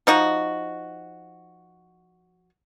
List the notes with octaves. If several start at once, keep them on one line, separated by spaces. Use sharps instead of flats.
F3 D#4 F#4